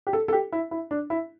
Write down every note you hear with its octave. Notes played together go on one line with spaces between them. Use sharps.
G4
A4
A4
G4
E4
E4
D4
E4